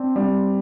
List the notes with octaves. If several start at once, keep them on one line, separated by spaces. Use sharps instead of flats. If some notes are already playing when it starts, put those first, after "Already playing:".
Already playing: C4 D4
G3